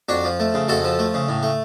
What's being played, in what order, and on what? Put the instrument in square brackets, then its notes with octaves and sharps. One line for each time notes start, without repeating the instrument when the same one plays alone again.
[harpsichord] F2 D4 F#4
F3
A3
C#3
F2 F#4 A4
F3
A3
C#3
A2
A3